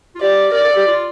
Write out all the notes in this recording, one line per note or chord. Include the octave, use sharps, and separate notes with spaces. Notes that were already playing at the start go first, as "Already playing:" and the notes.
F4
G4 D5
A#4 D5
A4
G4
F4